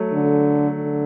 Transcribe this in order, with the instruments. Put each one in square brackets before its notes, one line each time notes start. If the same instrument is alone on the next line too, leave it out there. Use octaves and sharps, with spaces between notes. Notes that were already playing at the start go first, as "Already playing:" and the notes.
Already playing: [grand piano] F#3 A3
[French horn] D3
D3